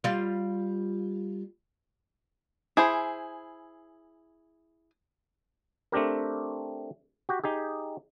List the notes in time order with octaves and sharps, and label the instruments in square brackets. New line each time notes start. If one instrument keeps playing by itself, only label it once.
[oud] G3 F4
[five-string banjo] E4 G#4 C5 [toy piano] G#5
[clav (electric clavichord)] A3 C4 D4 G4 A#4
F#4 G4
D#4 G4 G#4